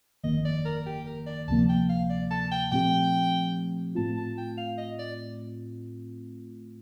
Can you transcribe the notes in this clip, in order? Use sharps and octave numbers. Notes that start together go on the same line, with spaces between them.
G1 F2 D#3 A#3 D#5
D5
A#4
G4
A#4
D5
D2 C3 F3 A#3 A5
G5
F5
D5
A5
G5
A#2 F3 A3 C4 G4 G5
A2 A3 C4 F4 A5
A5
G5
F5
D#5
D5